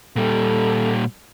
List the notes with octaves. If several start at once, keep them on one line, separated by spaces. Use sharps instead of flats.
A#2 G3 A4